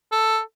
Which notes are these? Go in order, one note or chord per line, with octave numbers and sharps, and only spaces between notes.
A4